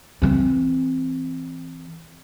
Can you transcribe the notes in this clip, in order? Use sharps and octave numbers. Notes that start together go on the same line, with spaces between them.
E3 C4